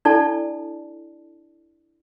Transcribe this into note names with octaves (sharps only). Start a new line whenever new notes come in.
D4 E4 A4 D5 A5